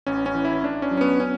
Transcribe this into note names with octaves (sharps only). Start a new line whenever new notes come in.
A1 C#4
C#4
E3
E4
A1 D4
C#4
F#3
C#4
B3
C#4